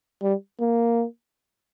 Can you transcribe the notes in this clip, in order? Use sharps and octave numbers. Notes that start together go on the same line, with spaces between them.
G3
A#3